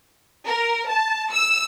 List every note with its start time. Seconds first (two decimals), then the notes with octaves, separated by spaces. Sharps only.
0.46 A#4
0.88 A5
1.33 E6